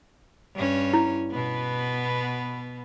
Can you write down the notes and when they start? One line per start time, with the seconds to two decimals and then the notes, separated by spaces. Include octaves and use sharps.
0.56 G2 C#4
0.93 E4
1.31 B2 B3